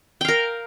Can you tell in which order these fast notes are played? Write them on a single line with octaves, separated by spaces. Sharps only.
G5 F5 A#4